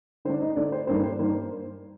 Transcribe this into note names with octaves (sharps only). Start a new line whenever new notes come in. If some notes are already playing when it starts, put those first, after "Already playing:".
D3 A3 D4 C5
D#4 D#5
D3 A3 D4 D5
C5
G2 D#3 A#3 D4 C5
C5
G2 D#3 A#3 D4 C5